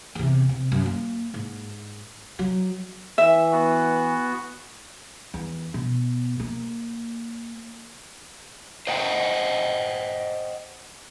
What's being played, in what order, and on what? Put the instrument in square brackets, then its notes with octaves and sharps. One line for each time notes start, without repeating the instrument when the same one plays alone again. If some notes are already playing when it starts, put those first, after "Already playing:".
[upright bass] E2 C3
C3
F#2
A#3
G#2
F#3
[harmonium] E3 [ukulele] E5
[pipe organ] B3 F#4
[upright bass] E2
B2
A#3
[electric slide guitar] C5 D#5 F#5 G5